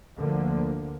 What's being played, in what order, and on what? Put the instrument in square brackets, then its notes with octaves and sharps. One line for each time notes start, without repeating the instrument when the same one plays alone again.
[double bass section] D2 D3 F3 A#3